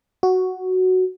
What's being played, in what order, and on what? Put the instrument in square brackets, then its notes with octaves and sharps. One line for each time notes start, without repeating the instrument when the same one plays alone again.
[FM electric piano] F#4